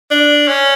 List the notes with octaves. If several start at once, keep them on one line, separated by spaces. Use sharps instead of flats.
D4
C#4